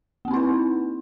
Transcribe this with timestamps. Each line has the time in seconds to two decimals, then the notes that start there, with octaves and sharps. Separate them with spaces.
0.25 A#3
0.28 C4
0.31 D#4
0.34 E4
0.36 B4